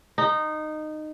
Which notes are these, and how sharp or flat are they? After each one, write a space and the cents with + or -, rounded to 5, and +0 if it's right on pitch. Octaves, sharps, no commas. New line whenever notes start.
D#4 -15